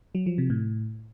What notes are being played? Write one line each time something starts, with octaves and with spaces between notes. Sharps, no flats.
F#3
F3
C3
A2